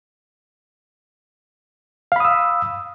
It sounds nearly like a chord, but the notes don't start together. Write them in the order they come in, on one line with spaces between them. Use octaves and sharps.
F5 B5 D#6 E6